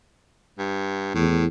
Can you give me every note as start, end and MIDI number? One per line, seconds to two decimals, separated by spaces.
0.59 1.11 43
1.15 1.48 40
1.15 1.45 45